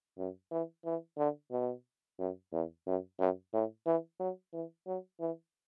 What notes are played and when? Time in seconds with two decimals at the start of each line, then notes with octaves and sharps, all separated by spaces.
0.18 F#2
0.52 E3
0.85 E3
1.18 D3
1.51 B2
2.19 F#2
2.53 E2
2.87 F#2
3.19 F#2
3.54 A2
3.86 E3
4.20 F#3
4.53 E3
4.87 F#3
5.20 E3